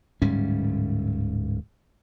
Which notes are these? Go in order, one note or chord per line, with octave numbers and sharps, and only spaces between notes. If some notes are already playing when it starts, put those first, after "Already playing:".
D1 G#2 G3 C#4